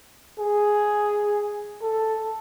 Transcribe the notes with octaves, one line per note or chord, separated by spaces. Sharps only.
G#4
A4